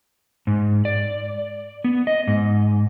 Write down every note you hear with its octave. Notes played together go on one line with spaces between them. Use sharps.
G#2
D5
B3
D#5
G#2